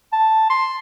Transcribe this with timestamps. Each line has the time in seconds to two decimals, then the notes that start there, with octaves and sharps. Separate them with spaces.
0.13 A5
0.50 C6